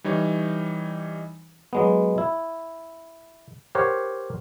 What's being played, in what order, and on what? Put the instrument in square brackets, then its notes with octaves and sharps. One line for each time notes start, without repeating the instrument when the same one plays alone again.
[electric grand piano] E3 G3 D#4 C#5
[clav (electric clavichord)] F#3 G#3 B3
E4
G4 A#4 C5 C#5 F#5